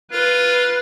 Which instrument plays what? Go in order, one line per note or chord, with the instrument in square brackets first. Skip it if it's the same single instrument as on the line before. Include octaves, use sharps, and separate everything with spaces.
[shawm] F4 [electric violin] B4